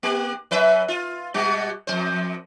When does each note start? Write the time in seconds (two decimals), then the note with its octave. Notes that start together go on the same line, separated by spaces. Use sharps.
0.03 A#3 G4
0.51 F#2 B4 E5
0.88 F4
1.34 B2 G3 F#4
1.87 F2 F#3 C5